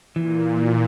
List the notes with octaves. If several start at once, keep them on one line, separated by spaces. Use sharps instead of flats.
A#2 E3